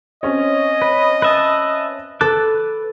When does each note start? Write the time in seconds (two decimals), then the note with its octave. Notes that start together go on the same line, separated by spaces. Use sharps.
0.23 C4 C#4 C#5 D#5
0.82 B4
1.22 B4 E5 A5
2.21 A4 B4 D6 F#6